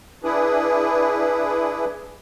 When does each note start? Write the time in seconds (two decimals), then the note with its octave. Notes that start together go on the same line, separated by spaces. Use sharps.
0.24 D4 E4 G#4 B4